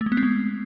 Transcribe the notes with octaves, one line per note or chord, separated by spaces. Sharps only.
A3
G#3
B3
C4
G#3